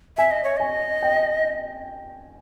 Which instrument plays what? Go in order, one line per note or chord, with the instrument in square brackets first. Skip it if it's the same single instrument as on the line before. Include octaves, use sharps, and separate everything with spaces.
[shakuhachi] E5 [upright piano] G#5
[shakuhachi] D#5
C#5
[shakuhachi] D#5 [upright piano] G#5
[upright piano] G5